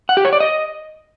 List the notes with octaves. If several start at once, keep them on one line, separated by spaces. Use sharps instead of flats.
F#5
G4
C#5
D5
D#5